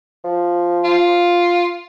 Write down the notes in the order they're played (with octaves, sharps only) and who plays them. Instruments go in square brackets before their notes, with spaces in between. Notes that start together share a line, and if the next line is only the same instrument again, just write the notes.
[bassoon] F3
[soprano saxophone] F4